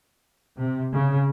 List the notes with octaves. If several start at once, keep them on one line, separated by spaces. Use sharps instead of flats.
C3
C#3